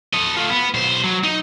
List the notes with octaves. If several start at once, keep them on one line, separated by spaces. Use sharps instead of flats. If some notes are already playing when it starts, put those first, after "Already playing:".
A4 D#5
A3 F4
B3
B1 C5
F#3
D#4